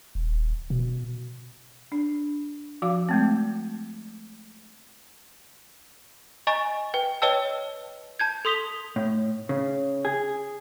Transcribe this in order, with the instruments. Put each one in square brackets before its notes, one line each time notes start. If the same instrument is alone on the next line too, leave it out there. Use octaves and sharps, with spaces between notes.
[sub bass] D#1
B2
[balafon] D4
F3 F#4 F5 D6
G#3 A3 C4
[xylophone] D#5 G#5 A#5 C#6 A6
B4 G5
B4 C#5 D#5 G5 A5 E6
A5 G6 G#6
A4 C6 D#6 B6 F7 G7
[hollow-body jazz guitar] A2
C#3
G#4